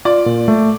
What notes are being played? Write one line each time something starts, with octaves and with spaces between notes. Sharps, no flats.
F4 D5
A#2
A3